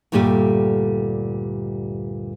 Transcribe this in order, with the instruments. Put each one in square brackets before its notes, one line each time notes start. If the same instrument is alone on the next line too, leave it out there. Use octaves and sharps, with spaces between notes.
[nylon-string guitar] D2 G2 A#2 G3 A3 G4